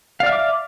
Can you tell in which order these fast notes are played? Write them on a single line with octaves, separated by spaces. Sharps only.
F5 D5 F6 E5 D6